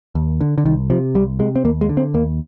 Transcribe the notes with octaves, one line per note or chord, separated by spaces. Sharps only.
D#2
D3
D3
C2 D#3
C3 F3
C2 G3
C3 G#3
C4
D#2 A#3
G#3
D3
C4
D#2 A#3